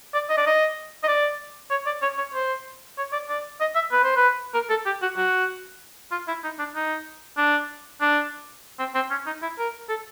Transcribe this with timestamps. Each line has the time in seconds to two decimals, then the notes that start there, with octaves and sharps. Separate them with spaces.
0.14 D5
0.30 D#5
0.37 D5
0.46 D#5
1.04 D#5
1.08 D5
1.71 C#5
1.86 D5
2.02 C#5
2.18 C#5
2.34 C5
2.98 C#5
3.13 D5
3.29 D5
3.60 D#5
3.75 E5
3.92 B4
4.04 C5
4.16 B4
4.54 A#4
4.70 A4
4.86 G4
5.02 F#4
5.17 F#4
6.11 F4
6.28 E4
6.44 D#4
6.59 D4
6.75 D#4
7.37 D4
8.01 D4
8.79 C4
8.95 C4
9.10 C#4
9.26 D#4
9.42 E4
9.59 A#4
9.89 A4